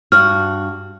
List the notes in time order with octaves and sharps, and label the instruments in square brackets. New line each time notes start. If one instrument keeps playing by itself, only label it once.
[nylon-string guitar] G2 F#4 [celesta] F6